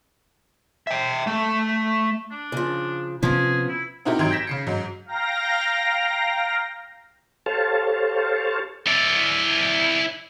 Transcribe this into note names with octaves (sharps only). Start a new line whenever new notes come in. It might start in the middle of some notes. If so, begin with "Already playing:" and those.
E5 G5
A3
D4
C#3 F3
C3 F3 B3 C#4 G#4
E4
C4 D#4 E4 F#4 G4 A#4
G#1 D#3 F#3 C6 G#6 D7
G6 A#6 B6 E7
C#3 C7 C#7
G#2 F#3
F5 G5 A#5 A#6
G4 A4 C5 C#5 F5 A5
E4 D5